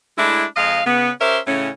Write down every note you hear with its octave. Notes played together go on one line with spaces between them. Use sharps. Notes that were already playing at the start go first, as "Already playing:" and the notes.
G#3 A3 D4 E4
F2 G#3 D#5 F5
C#3 B3
C#4 G4 A#4 C5 E5
A2 C#3 A3 C#4